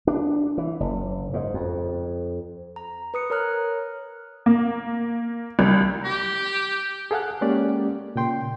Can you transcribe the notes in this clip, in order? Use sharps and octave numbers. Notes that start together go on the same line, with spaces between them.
D4
E3
F#1
G#2
F2
A#5
B4 D#6 C#7
A#4 C#5 A#5 F6 F#6
A#3
C2
G4
G#4 A4 F5 F#5 F#6
G#3 A#3 C#4 G4 D5
A#2 C#3 G5 C6